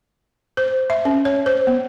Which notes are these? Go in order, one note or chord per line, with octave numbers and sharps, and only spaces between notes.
C5
E5
C#4
C#5
C5
B3